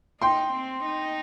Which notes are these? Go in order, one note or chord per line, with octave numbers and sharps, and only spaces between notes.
D#4 G5 C6
C4
D#4